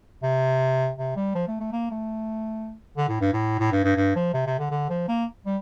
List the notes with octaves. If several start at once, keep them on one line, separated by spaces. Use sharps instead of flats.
C3
C3
G3
F3
A3
A3
A#3
A3
D3
A2
G2
A2
A2
G2
G2
G2
F3
C3
C3
D3
D3
F3
A#3
G3